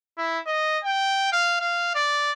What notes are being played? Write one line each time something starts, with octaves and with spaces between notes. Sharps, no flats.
E4
D#5
G5
F5
F5
D5